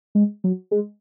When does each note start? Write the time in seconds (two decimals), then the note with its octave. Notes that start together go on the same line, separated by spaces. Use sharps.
0.15 G#3
0.44 F#3
0.71 G#3